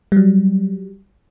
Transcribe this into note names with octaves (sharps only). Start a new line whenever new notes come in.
F#3 G3